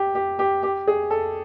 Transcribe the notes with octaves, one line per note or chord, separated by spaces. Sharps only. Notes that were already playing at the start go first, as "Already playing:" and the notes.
Already playing: G4
G4
G4
G4
G#4
A4